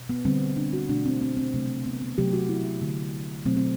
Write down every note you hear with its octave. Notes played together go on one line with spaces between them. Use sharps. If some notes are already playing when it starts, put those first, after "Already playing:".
Already playing: B2
B3
D3 G3 C4
D4
F#4
B2 A3 D4
C4
C4
C4
C3 F#3 A3
B3
B3
C3 F#3 A3 G4
F#4
E4
D3 A3
B2 F#3 A3 C4
C4